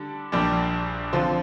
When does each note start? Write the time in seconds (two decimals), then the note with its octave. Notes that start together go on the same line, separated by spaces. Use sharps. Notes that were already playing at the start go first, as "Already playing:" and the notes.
Already playing: D3 G3 D4 A4
0.32 A#1 A#2 G3 D4 G4
1.13 D3 F3 C4 F4 C5